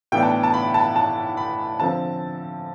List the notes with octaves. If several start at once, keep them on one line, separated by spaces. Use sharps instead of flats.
A2 E3 B3 D4 G5
A5
A5
B5
A5
A5
B5
D3 F3 C4 A5